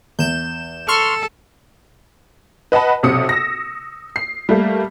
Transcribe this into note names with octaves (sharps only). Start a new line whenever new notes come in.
E2 G6 E7
A4 C6 C#6 F6
B4 D#5 F#5 A5 B5
B1 C3 D#6 C#7
E6 A#6
C7
G3 A3 A#3